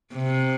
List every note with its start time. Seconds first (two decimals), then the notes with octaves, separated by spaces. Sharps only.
0.14 C3